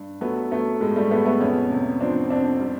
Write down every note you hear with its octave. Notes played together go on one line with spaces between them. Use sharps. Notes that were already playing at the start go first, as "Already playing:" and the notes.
Already playing: G2
F#3 A3 B3
F#3 A3 B3
A2 G#3
G3 A3
A2 A3 B3
A3 B3
F2 B3 C#4
C3
F3 C4 D4
F2 C4 D4
G3